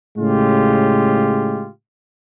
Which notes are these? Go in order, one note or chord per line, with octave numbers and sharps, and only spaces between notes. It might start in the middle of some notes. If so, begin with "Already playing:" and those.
A2 C#3 G#3 F4 G4